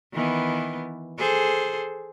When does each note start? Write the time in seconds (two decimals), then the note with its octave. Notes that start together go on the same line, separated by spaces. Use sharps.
0.13 D#3 E3 B3
1.18 G#4 A4 C5